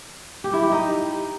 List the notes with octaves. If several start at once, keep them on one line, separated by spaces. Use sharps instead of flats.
G4
E4
G4
D#4